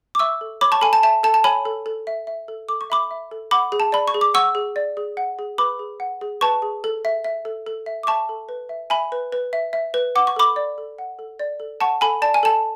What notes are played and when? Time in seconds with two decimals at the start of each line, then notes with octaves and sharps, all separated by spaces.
0.15 D6
0.19 E5 C#6 E6
0.41 A4
0.61 C#5 B5 D6
0.72 A5 C#6
0.81 A4 G#5 B5
0.93 A5
1.03 E5 A5
1.23 A4 A5
1.34 A5
1.44 C#5 G#5 B5
1.65 A4
1.86 A4
2.07 E5
2.27 E5
2.48 A4
2.69 A4 D6
2.81 C#6
2.90 E5 B5 D6
3.11 E5
3.31 A4
3.51 F#5 B5 D6
3.72 G#4
3.80 A5
3.92 D5 B5
4.08 C#6
4.14 G#4
4.21 D6
4.34 F#5 C#6 E6
4.55 G#4
4.76 D5
4.97 G#4
5.17 F#5
5.39 G#4
5.58 B4 B5 D6
5.79 G#4
6.00 F#5
6.21 G#4
6.41 B4 A5 C#6
6.62 G#4
6.84 A4
7.05 E5
7.24 E5
7.45 A4
7.67 A4
7.86 E5
8.03 D6
8.07 E5 A5 C#6
8.29 A4
8.49 B4
8.69 E5
8.90 E5 G#5 B5
9.12 B4
9.32 B4
9.53 E5
9.73 E5
9.94 B4
10.15 F#5 D6
10.27 C#6
10.36 A4 B5 D6
10.56 D5
10.78 A4
10.99 F#5
11.19 A4
11.40 D5
11.60 A4
11.81 F#5 A5 C#6
12.01 A4 G#5 B5
12.22 D5 A5
12.34 G#5
12.43 A4 A5